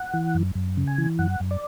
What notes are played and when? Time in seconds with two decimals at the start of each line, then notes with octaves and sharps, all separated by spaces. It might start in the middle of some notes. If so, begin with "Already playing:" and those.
Already playing: F#5
0.14 E3
0.35 F#2
0.55 F#2
0.77 C#3
0.87 G#5
0.98 E3
1.19 F#2 F#5
1.40 F#2
1.51 D5